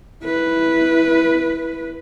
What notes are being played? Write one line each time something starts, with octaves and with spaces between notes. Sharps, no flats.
E4 B4